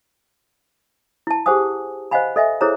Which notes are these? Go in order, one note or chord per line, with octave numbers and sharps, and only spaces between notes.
E4 A5
G4 G#4 C5 F#5 G#5 D#6
C5 D#5 F5 F#5 G#5 B5
A4 D#5 E5 G#5
E4 G#4 A4 C5 C#5 A#5